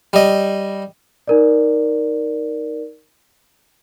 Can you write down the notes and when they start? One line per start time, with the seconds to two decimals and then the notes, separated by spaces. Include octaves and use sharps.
0.13 G3 D#5
1.28 D#4 A#4 D5